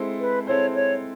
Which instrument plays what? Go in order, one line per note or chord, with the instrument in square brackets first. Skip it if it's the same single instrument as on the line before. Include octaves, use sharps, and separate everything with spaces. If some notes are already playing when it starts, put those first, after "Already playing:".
Already playing: [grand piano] G#3 C4 E4 A4 C5
[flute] B4
[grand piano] G#3 C4 E4 A4 C5 [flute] C#5
[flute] C#5